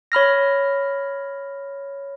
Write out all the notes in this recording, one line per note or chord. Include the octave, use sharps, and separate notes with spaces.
C#5 B5 F6 A#6